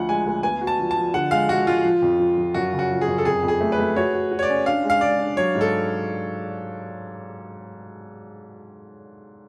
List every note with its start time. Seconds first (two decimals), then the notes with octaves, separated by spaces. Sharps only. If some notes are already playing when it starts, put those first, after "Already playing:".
Already playing: D2 F3 F#5
0.09 G#3 G#5
0.26 D2
0.43 B3 G#5
0.61 F#4
0.67 A5
0.79 F3
0.91 A5
0.96 F3
1.14 D3 F#5
1.31 G#3 F5
1.49 G#3 F#4
1.66 G#3 F4
1.84 F3
2.02 F2
2.19 F3
2.38 F3
2.54 F#2 F#4
2.73 C#3
2.79 F#4
2.91 F3
3.01 G#4
3.08 F#2
3.18 A4
3.25 F2 G#4
3.43 F2
3.48 G#4
3.61 A3
3.72 B4
3.78 A3
3.96 F#4 C#5
4.14 F#4
4.31 F#4
4.39 C#5
4.43 D5
4.49 C#4
4.66 D4 F5
4.84 G#3
4.90 F5
5.01 G#3 D5
5.19 D4
5.36 F#3 C#5
5.55 G#2
5.61 A4